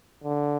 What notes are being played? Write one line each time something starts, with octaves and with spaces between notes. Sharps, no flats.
D3